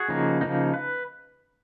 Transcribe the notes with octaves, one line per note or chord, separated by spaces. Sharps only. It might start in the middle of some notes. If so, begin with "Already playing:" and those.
Already playing: F#4 G#4
C#3 F3 A#3 D#4
C#3 F3 A#3 D#4
B4